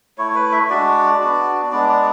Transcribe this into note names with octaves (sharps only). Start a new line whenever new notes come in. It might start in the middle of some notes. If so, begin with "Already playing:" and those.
A3 E4 C#5
B4
E5
G#3 D4 F#4 D5
B3 D4 F#4
G#3 B3 D4 D5
D5